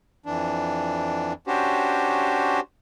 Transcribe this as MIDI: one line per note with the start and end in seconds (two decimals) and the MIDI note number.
0.26 1.33 41
0.26 1.33 52
0.26 1.33 62
1.47 2.60 61
1.47 2.60 62
1.47 2.60 66
1.47 2.60 67
1.47 2.60 72